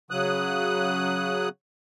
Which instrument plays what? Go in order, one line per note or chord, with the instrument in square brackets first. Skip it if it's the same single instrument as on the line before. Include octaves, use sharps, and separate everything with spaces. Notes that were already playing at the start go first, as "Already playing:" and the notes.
[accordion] C#3 F#3 D#6 F#6